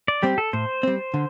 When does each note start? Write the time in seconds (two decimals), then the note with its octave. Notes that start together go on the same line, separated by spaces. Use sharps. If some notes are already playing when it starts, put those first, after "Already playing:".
0.08 D5
0.23 G3 C4 G4
0.38 A4
0.53 A2 C5
0.83 G3 C4
1.14 D3